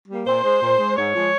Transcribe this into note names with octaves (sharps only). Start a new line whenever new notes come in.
G3 A#3
A#2 C5
G#3
A#2
G#3
G#2 C#5
F3 G#3